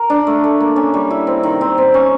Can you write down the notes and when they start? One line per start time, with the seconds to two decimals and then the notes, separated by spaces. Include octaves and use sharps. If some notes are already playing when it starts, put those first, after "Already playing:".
Already playing: A#4
0.10 D4
0.27 A3
0.44 A3
0.60 A#3
0.76 C#4
0.94 G3
1.10 E4
1.27 C4
1.43 D#3
1.61 C4
1.78 C4
1.94 C#4